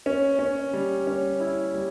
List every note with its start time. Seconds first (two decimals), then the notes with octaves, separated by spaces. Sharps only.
0.06 C#4
0.39 C#4
0.73 G3
1.07 C#4
1.40 E4
1.74 G3